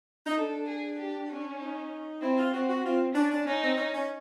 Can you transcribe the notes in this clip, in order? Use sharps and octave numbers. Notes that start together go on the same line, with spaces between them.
D#4
D4 A4
G#4
G4
C#4
D#4
C4 E4
F4
C4 F#4
F#4
C4 F4
C#4 D4
D4
C#4 D#4
C4
C#4
C#4